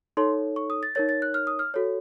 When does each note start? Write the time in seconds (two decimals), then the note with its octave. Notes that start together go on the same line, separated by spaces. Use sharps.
0.17 D#4 A4 C#5 C6
0.56 C#6
0.70 D#6
0.83 A6
0.95 D#4 A#4 C#5 A6
1.09 A6
1.22 F#6
1.34 F6
1.47 D#6
1.59 F6
1.74 F#4 A4 C#5